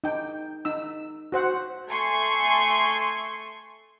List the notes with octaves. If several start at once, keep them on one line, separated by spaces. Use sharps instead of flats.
D#4 G5
D#4 E6
F#4 C5 F#5
A3 G#5 C6 C#6